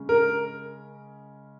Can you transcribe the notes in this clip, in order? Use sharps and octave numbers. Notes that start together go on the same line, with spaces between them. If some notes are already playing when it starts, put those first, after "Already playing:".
Already playing: C#3 G#3 C#4
A#4